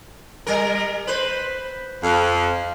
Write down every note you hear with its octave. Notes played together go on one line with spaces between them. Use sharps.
G3 A#4
B4 C5
F2